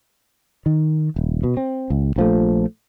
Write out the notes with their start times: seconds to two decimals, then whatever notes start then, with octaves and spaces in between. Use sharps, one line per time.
0.66 D#3
1.16 D#1
1.43 B2
1.57 C4
1.90 C#2
2.16 A#1 F3 A3